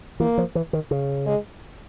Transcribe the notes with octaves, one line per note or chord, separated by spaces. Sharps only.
E3 A#3
F3
E3
D#3
C#3
G#3